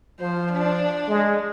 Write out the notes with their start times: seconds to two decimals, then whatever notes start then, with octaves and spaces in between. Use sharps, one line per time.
0.20 F3 C5
0.52 D4
1.08 G#3